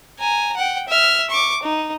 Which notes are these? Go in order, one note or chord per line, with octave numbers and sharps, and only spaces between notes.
G#5 A#5
F#5 G5
E5 F6
C#6 D6
D#4